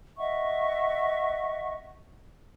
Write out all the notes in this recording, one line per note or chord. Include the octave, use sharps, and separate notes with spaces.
D#5 E5 F#5 C#6